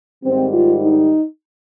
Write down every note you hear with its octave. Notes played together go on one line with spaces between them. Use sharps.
G#2 D#3 G3 C4
F4
D#4